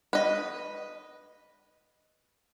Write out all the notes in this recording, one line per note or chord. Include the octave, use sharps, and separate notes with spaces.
B4 D#5